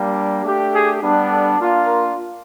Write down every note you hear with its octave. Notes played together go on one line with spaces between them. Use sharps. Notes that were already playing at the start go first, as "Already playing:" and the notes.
Already playing: G3 A#3 D4 G4
A3 D4 G4
G#4
G3 B3 D4
A4
A#3 D4 F4
A#4